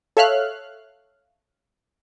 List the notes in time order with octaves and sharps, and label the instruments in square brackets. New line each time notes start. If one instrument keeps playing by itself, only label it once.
[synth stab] A4 C#5 E5 F5 F6 F#6